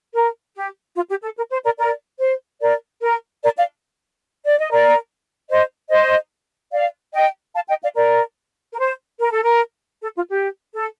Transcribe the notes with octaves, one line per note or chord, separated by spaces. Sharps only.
A#4
G4
F4
G4
A4
A#4
C5
A#4 D5
A#4 D5
C5
A#4 D5
A#4
A#4 D5
D5 F5
D5
D#5
A#4 D5
C5 D#5
C5 D#5
D5 F5
D#5 G5
F5 A5
D#5 G5
D5 F5
A#4 D5
A#4
C5
A#4
A4
A#4
A4
F4
G4
A4